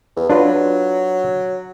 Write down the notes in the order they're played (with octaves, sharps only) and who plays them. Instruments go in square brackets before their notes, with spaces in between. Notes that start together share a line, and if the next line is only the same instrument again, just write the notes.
[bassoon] E2
[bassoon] F#3 [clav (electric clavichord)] D4 F4 B4